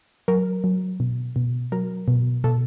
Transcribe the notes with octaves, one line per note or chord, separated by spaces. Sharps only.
F#3 A#4
F#3
B2
B2
F#3 A#4
B2
B2 A4